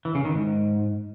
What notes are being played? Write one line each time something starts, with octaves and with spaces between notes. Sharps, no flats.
E3
C#3
D#3
G#2